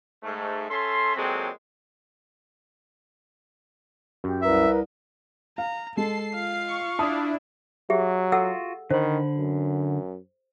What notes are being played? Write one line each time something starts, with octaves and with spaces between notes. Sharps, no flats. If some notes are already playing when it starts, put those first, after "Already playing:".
G#2 A3
C#4 A4 E5 C6
A#2 F#3 G#3 C4 A4 G5
F#2 G4
C2 A#4 B4 E5
F5 A#5
G#3 A4 A5 C7
F4 F5
C#6
D4 E4 A5 D#6
F#3 G4 G#4 E5
F4 F#4 A4 F#5 E6
D3 D#3 C5 B5
F#2